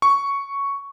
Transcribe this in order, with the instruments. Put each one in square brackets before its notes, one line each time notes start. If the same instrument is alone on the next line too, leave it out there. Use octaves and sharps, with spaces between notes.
[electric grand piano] C#6